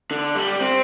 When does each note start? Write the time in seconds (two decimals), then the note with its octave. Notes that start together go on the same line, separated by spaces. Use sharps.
0.11 D3
0.35 G3
0.60 C4